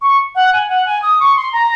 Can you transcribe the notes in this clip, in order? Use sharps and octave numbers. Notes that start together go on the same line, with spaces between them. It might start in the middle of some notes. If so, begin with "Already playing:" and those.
C#6
F#5
G#5
F#5
G#5
D#6
C#6
C6
A#5